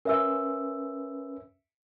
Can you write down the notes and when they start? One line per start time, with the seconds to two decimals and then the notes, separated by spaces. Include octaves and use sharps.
0.05 C#4 A#4 B4 E5 E6